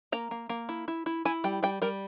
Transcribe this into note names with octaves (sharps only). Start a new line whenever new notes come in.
A#3 A#5
A#3
A#3
E4
E4
E4
E4 G#5
G3 G5
G3 G5
G3 A#4